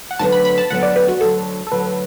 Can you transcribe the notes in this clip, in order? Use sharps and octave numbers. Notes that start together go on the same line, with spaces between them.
F#5
D2 D3 F#3 B3 A5
B5
B5
A5
D2 D3 F#3 B3 F#5
D5
B4
F#4
D2 D3 F#3 A4
A4
D2 D3 F#3 B4